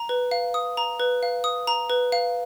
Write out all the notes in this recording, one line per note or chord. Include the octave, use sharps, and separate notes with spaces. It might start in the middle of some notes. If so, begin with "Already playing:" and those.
Already playing: A#5
B4
F5
D#6
A#5
B4
F5
D#6
A#5
B4
F5